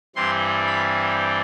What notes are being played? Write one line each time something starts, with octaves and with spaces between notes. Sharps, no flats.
G2 E3 G3 C4 C6
B5